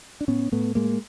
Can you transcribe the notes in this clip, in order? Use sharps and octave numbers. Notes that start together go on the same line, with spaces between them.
D4
A2 B3 C#4
A2 A3 B3
A2 G#3 A#3